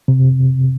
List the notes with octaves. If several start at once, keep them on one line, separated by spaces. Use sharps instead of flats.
C3